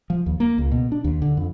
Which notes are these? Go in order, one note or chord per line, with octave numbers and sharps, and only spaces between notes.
F3
D#2
A#3
C#2
B2
D4
D#2
D3
F2